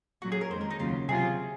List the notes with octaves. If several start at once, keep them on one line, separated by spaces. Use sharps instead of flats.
A#2 F#3 C#4 F#4
G#4
A#4
F2 D#3 G#3 C5
A#4
D#4
D#2 C#3 F#3 F4
C3 F#3 C4 F4 G#4